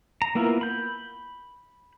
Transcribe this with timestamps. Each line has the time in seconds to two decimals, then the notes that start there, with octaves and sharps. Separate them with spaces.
0.22 A#5
0.35 A#3 B3 E4 F4 A#4
0.61 B5 G6